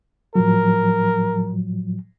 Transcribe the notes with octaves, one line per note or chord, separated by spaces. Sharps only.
A2 F3 F#3 A#4